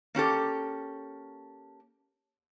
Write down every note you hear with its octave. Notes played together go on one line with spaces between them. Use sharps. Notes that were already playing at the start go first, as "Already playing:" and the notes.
A#3 C#4 G4 A4